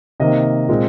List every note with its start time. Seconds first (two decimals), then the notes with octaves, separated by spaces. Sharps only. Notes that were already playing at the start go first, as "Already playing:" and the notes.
0.20 C3 D#3 A#3 D#5
0.69 A#2 G#3 C4